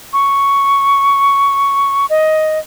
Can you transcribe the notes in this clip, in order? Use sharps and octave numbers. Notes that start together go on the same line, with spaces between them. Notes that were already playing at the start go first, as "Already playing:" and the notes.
C#6
D#5